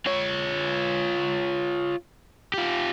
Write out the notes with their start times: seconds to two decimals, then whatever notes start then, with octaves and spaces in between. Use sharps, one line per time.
0.06 F4 C#5
2.54 F4 G4